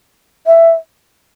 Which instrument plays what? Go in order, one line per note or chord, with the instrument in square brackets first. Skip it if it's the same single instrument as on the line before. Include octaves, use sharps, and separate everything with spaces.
[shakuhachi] E5